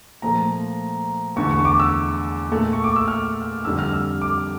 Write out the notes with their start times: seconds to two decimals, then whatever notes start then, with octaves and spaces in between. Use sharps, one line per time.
0.22 A#2 F3 A3 A#5
1.36 E2 D3 A3 C#6
1.51 C#6
1.65 D6
1.80 E6
2.51 A#2 A3
2.73 C#6
2.84 D6
2.96 E6
3.08 F6
3.65 F2 D3 G3 E6
3.79 F6
3.93 E6
4.22 D6